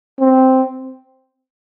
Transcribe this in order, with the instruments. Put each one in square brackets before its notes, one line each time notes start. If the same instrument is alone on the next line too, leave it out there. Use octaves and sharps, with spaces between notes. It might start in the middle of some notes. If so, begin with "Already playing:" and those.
[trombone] C4